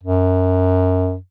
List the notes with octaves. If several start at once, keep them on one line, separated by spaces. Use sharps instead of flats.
F#2